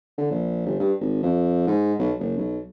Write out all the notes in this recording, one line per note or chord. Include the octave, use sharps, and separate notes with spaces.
D3
A#1
G1
G2
G#1
F2
G#2
B1
F#1
B1